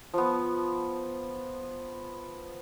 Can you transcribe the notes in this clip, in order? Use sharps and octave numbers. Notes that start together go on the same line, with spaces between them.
F3 B3